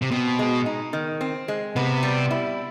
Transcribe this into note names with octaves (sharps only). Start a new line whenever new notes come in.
C3
B2 C4
G#3
D#4
D#3
C4
G#3
C3 B3
G3
E4